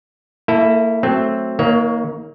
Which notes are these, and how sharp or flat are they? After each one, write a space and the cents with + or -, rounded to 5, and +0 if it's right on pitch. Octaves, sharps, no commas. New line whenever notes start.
A#3 -30 E4 +0 A4 +0
F#3 +5 A3 +0 C4 +0
D#3 +40 A#3 +0 C#5 +25